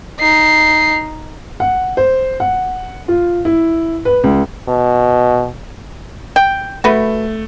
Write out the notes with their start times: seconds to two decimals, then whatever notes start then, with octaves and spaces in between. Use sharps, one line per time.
0.19 D#4 C7
1.60 F#5
1.97 C5
2.40 F#5
3.08 F4
3.45 E4
4.05 B4
4.24 C#2
4.68 B2
6.36 G5
6.84 A3 F#4 B4